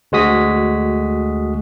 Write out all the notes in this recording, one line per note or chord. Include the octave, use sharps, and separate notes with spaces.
D2 G#3 F#4 D#6 B6